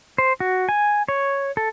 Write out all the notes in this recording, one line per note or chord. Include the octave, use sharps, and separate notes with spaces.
C5
F#4
G#5
C#5
A4